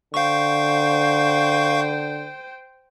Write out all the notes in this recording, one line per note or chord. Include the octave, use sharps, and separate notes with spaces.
D3 C5 F5 G5 C#6